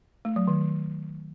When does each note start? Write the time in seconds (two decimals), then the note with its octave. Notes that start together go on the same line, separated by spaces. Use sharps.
0.25 A3
0.36 F#3
0.47 D#3